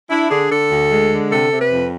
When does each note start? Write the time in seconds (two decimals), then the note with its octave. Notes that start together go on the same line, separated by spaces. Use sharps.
0.10 D4 E4
0.30 D3 G#4
0.50 D3 A4
0.70 D2
0.91 G#3
1.10 D3
1.31 C3 A4
1.51 C3
1.61 B4
1.71 F2